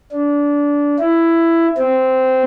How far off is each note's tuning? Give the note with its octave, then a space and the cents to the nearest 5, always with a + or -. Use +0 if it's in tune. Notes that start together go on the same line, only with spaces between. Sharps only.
D4 -20
E4 +10
C4 -10